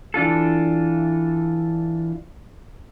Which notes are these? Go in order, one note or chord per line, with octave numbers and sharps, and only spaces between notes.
E3 D4 F4 A4